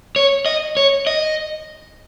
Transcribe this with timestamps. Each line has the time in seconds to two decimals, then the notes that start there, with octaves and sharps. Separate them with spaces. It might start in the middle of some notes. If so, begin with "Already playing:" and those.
0.16 C#5
0.46 D#5
0.77 C#5
1.07 D#5